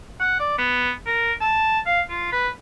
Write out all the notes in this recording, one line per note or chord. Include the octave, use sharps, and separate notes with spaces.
F#5
D5
B3
A#4
A5
F5
F4
B4